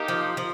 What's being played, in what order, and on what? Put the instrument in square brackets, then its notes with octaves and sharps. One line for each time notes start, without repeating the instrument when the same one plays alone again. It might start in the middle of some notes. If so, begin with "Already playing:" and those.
Already playing: [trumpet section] A#3 D#4 G4
[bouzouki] F3
F3